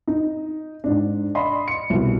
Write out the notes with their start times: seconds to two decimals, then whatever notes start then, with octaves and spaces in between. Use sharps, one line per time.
0.07 D#4
0.84 G#2 D4
1.35 D5 D#5 B5 C6
1.68 C#7
1.90 C2 B2